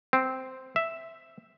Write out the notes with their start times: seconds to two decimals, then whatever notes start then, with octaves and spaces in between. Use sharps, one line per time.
0.13 C4
0.76 E5